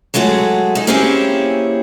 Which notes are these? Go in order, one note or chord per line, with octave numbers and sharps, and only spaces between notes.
F#3 G#3 A3 F#4 G#4
G#3 D#4
A#3 C4 C#4 E4 G4 G#4